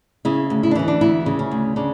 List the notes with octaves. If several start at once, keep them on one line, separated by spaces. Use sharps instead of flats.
C#3 E4
D2
E4
D4
E3 C#4
D4
D2 E4
C#3
C#4
D2
C#3 D4